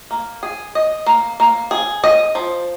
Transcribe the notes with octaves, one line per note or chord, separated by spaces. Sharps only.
A#3
G#4
D#5
A#3
A#3
G#4
D#5
F3